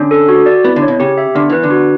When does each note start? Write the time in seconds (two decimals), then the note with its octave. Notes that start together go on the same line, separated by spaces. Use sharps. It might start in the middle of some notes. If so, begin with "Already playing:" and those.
Already playing: D3 C#4
0.11 A4
0.29 F#4
0.46 D5
0.64 B3 E4
0.76 D3
0.82 C#5
0.88 B2
1.00 C#3 G4
1.18 E5
1.35 D3 B3
1.50 E3 B4
1.63 D3
1.71 F#4